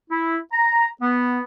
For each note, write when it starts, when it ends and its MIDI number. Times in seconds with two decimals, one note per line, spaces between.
0.11 0.37 64
0.53 0.87 82
1.01 1.42 59